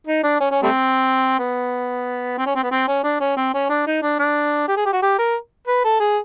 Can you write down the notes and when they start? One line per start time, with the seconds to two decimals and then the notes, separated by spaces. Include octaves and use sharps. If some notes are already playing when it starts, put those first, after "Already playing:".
0.07 D#4
0.23 D4
0.40 C#4
0.51 C#4
0.63 G3 A3 C4
1.39 B3
2.38 C4
2.46 C#4
2.55 C4
2.63 B3
2.71 C4
2.88 C#4
3.04 D4
3.20 C#4
3.37 C4
3.54 C#4
3.70 D4
3.87 D#4
4.02 D4
4.19 D4
4.68 G4
4.77 G#4
4.86 G4
4.93 F#4
5.02 G4
5.19 A#4
5.68 B4
5.84 A4
6.00 G#4